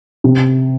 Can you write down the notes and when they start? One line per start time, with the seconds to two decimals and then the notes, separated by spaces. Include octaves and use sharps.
0.24 C3